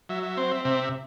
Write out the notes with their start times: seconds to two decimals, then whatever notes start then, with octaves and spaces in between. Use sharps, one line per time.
0.09 F#3 E5
0.23 E5
0.37 C4 C5
0.52 E5
0.65 C3 E5